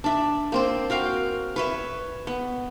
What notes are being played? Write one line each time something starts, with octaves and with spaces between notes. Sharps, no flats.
D4 E5
A#3 C4 C5
F#4 A#4 F5 G5
B4 C#5 E5
B3